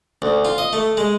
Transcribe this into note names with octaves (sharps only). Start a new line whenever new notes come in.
D2
F4
D#5
A3
G#3